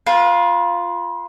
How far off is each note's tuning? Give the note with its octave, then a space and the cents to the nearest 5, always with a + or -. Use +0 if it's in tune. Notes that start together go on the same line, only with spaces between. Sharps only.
F4 +0 B4 -45